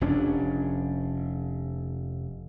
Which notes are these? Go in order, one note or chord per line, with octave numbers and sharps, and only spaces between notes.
F1 F3 C#4 D4